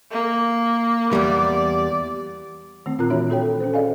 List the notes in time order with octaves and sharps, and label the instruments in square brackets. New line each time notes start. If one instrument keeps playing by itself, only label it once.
[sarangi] A#3
[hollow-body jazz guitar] E2 G3 [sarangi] D5
[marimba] D#3 A3 C4
A#2 C4 F4 A#4 A#5 F#6
E3 D4 F#4 C#5 E5
F#4 A4 C#5 G5
C#4 A4 C5
G#4 D5 D#5 F5 G#5